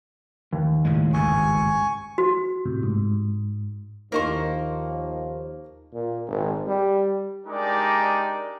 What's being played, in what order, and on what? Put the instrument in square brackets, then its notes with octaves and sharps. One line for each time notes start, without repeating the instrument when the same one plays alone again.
[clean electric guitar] D#2
[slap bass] A2 C#3 G#3
[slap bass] G#1 C#2 G2 [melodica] G#5 C#6
[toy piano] F#4
[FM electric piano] A2 C3
G#2
[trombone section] D#2 [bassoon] F3 [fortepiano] A#3 D#4 C#6 [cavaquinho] A#4 C5 C6
[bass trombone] A#2
G#1
G3
[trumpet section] G#3 D4 D#4 G4 A#4 D5